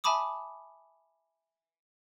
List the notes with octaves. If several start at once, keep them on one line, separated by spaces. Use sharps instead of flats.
E5 G#5 A5 B5 D6 D#6